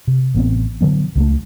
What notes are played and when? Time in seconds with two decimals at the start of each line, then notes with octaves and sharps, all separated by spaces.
0.07 C3
0.35 A1 B3 C4
0.81 D3 F3 F#3 B3
1.16 C#2 F#3 A3